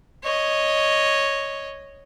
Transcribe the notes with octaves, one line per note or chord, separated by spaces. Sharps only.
C#5 D#5